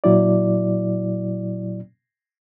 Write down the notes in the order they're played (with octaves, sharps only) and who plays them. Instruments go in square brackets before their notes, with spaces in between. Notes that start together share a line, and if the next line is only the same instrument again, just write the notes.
[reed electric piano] A#2 F#3 E4 D5